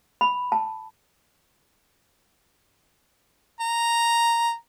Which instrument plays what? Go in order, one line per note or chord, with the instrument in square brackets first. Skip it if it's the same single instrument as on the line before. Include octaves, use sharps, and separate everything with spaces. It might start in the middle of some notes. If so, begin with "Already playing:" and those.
[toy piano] B5
A5
[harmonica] A#5